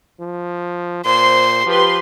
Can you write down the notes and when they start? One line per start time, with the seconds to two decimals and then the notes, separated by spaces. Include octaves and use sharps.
0.20 F3
1.05 A#2 C5 C6
1.66 F3 G4 B4 C6